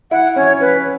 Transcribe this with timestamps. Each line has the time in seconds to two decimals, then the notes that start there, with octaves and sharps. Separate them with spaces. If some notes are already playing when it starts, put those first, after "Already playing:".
0.11 E4 F#5
0.36 C#4 C#5
0.60 C#4 B4